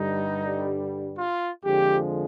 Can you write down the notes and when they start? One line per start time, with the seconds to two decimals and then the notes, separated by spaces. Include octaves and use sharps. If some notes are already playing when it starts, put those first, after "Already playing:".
Already playing: G2 D3 G3 D#4
1.18 F4
1.65 F2 D3 F3 G#3 G4